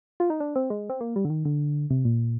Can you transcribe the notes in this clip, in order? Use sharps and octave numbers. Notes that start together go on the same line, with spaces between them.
F4
D#4
D4
C4
G#3
C4
A#3
G3
D3
D#3
D3
C3
A#2